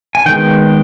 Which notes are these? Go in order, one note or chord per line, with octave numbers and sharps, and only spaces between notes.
G#5
D#3 G#3 B3 G5